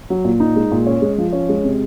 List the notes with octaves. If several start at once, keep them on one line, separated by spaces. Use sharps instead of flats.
F#3
A#2
D#4
G#3
A#2
C#4
G#3
F3
C#4
G#3
C3